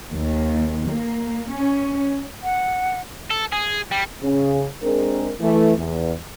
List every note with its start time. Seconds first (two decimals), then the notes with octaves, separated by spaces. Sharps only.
0.14 D#2
0.91 A#3
1.54 C#4
2.42 F#5
3.30 A4
3.52 G#4
3.91 G3
4.22 C#3
4.83 G#3 C4 D4 G#4 A#4
5.40 E3 A3
5.77 E2